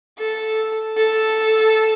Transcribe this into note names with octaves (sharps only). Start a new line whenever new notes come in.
A4
A4